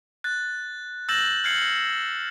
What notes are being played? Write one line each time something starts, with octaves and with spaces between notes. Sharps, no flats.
F#6 A6
E6 G6 A6 A#6 E7 F#7
F6 G6 G#6 C7 C#7 F#7